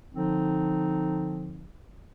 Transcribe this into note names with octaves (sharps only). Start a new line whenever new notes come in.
D3 F3 C4 D#4